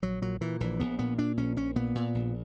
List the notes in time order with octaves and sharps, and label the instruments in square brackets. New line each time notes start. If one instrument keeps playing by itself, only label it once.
[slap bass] A#1 F#3
A#2 F#3
A#2 E3
A#1 E3
A#1 B3
A#2 B3
A#2 D4
A#1 C#4
A#1 C#4
A#2 B3
A#2
A#1